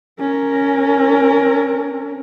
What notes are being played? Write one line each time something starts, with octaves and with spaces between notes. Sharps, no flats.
C#4 A#4